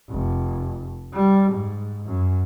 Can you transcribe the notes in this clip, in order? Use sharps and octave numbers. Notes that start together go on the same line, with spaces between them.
F1
G3
G#2
F#2